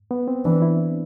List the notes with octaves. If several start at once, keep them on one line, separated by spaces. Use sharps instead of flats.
B3
C4
E3 D4
E4